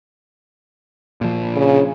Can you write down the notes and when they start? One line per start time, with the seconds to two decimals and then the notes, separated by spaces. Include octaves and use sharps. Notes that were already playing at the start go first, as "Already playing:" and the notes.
1.21 A#2 F3
1.56 C#3